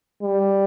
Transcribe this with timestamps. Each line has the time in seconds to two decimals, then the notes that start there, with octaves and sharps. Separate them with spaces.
0.22 G3